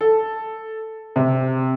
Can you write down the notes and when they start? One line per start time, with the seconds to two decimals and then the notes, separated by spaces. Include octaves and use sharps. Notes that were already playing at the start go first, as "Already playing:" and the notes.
0.01 A4
1.16 C3